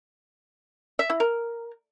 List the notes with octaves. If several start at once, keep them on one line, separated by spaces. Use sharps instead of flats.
E5
E4
A#4